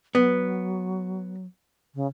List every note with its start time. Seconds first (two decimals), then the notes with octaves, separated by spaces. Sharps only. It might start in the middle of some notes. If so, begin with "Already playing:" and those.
0.15 F#3 B3
1.95 C#3